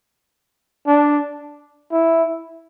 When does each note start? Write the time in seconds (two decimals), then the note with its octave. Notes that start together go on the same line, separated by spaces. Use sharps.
0.87 D4
1.92 E4